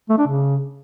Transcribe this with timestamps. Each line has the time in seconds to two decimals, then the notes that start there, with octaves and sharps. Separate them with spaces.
0.09 A3
0.18 D4
0.27 C#3